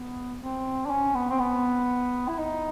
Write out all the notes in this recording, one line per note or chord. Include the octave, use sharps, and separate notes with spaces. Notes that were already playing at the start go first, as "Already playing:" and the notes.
Already playing: B3
C4
D4
C#4
B3
C4
B3
E4
D#4